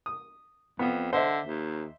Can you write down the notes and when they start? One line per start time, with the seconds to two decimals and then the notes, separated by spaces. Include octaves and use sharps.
0.06 D#6
0.79 F2 B3
1.13 D3 C5 D#5 E5
1.47 D#2